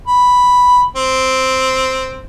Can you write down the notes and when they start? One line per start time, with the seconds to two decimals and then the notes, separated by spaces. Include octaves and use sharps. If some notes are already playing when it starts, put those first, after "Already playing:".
0.07 B5
0.96 C4